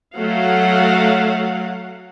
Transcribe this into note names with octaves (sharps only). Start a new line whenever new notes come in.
F#3 A3 F5 F#5